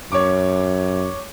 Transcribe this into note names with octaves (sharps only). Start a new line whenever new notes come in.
F#2 C#5 C#6 D6